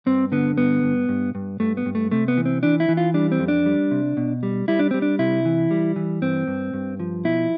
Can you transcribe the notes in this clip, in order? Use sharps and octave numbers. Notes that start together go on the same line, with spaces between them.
G2 C4
D3 B3
G2 B3
G2
G2
G2
G2 A3
B3
G2
A3
C3 A3
B3
E3
C4
E3 D4
E4
E3
F4
G3 D4
C4
F2
D4
G3
C3
B2
G3
G3 E4
D4
G3 C4
D4
C3 E4
E3
G3
E3
G2 C4
G2
G2
F3
B2 E4